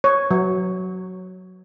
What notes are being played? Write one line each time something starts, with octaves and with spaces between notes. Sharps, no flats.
C#5
F#3